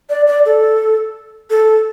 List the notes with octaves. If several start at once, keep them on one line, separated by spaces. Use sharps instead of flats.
D5
D5
A4
A4